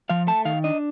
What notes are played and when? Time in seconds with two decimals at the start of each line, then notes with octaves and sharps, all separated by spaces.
0.09 F3 F5
0.27 A3 A5
0.45 D#3 F5
0.64 D4 D#5